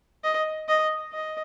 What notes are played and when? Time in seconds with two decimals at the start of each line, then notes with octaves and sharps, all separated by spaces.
0.24 D#5
0.68 D#5
1.12 D#5